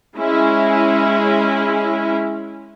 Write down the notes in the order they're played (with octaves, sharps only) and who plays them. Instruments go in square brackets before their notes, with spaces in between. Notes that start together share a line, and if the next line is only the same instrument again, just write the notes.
[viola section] G#3 C#4 E4